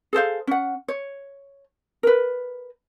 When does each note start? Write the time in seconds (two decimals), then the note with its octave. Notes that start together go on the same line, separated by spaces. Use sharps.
0.13 G#4 A4 C5 F5
0.47 C#4 F#5
0.88 C#5
2.03 A#4 B4